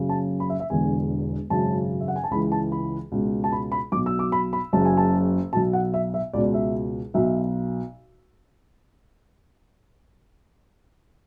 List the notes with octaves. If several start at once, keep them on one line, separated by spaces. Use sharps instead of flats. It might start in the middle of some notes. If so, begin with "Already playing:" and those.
Already playing: F#1 F#2 C#3
A5
B5
E5
E5
E1 E2 D3 G#5
G#1 F#2 C#3 A5
E5
F#5
G#5
A5
C#2 C#3 E3 B5
A5
B5
C#2 B2
A5
B5
B5
B1 B2 D6
E6
D6
B5
B5
F#1 F#2 C#3 A5
G#5
A5
B1 B2 A5
F#5
E5
E5
C#2 B2 D5
E5
B1 B2 E5